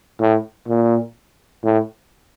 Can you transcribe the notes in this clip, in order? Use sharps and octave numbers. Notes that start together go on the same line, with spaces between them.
A2
A#2
A2